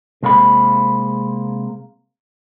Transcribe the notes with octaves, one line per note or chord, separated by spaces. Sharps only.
C3 G#3 A#3 C4 B5